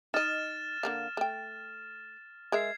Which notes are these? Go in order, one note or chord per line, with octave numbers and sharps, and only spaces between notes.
D#4 D#5 F6 A6 E7
D3 A#3 F5
A3 G5
G#3 A#4 E5 G#6 C7